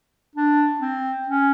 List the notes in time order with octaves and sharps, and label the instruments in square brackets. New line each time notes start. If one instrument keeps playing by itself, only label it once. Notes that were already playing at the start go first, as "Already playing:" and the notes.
[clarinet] D4
C4
C#4